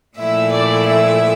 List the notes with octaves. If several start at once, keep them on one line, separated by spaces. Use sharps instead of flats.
A#2 F3 A3 E4 E5
D5
E5